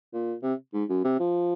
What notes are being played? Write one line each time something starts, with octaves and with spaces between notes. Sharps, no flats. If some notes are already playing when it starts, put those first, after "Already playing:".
A#2
C3
G#2
F#2
C3
F3